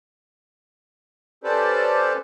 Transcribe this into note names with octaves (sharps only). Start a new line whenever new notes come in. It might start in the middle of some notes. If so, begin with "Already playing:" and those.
C#4 G4 A4 B4 C5 D5